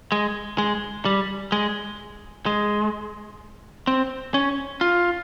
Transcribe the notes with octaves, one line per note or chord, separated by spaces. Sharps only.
G#3
G#3
G3
G#3
G#3
C4
C#4
F4